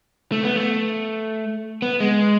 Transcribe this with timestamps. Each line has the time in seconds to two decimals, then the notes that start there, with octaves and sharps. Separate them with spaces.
0.32 A3
0.43 B3
0.55 A3
1.82 B3
2.00 G#3